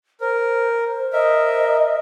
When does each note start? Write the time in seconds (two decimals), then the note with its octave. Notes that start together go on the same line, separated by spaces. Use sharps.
0.20 A#4 C5
1.13 A#4 D#5 E5